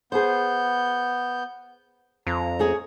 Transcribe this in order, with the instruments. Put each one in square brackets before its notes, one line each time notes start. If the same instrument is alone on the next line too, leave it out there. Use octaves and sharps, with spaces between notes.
[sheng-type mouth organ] B3 G6 [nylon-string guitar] G#4 C5
[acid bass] F2 [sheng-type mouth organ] A#5
[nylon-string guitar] A3 C#4 G#4